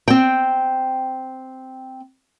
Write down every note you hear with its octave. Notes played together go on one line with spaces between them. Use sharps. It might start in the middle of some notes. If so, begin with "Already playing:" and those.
C4 G5